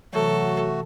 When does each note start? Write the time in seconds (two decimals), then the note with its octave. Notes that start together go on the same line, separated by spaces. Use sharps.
0.14 C3 E3 F#3 A3 F#4 A4